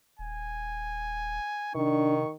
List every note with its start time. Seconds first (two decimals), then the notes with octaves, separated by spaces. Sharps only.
0.19 D#1 G#5
1.75 C3 D#3 D4 C#6